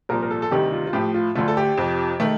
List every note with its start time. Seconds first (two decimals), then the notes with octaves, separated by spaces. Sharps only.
0.09 C2 A#2 F3 A#4
0.22 A#4
0.31 A4
0.42 A4
0.51 D2 C3 D#3 G3 G4
0.72 F4
0.87 F4
0.93 A2 F3 A3 G4
1.14 F4
1.35 D2 D3 A3 F4
1.48 A4
1.57 G4
1.77 F2 C3 F3
2.20 D#3 A3